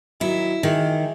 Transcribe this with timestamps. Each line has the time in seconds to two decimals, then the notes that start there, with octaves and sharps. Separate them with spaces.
0.21 D#3 F#3 E4
0.63 D#3 E3 G#3